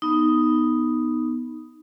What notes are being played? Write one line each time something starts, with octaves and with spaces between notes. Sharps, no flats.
B3 D#4